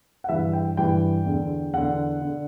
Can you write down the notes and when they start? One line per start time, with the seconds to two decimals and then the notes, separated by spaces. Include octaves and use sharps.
0.24 F#5
0.29 G2 E3 E5
0.53 G5
0.77 G2 E3 G5
1.26 E2 D3
1.73 E2 D3 F#5
2.22 D3